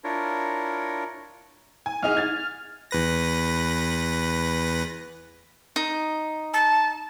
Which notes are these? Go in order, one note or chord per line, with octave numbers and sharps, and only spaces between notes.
D4 E4 F4 A#4 C#5
G#5
C2 D#4 G#4 F6
G#6 A6
E2 B4 A#6
D#4
A5